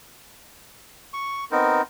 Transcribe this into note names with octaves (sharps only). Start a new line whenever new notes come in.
C#6
B3 C4 D#4 A#4